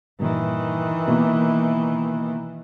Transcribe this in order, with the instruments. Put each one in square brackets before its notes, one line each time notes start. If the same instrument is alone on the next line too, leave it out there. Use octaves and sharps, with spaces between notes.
[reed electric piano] G2 A#2 [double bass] D#3 E3
[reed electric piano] B2 A#3